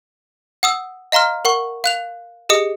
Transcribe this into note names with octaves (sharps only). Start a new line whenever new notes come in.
F#5 D#6 E6
D#5 F5 A#5 C6 F6
A#4 F#5 C#6
F5 F#6 F7
G4 G#4 D#5 D#6 C#7